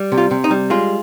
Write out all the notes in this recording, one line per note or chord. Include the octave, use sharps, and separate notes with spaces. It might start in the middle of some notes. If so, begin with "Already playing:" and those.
Already playing: G3
C3
F4
C3
D#4
G3
G#3 F4